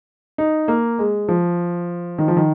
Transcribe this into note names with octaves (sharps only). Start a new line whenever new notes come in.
D#4
A#3
G#3
F3
D#3
F3
D#3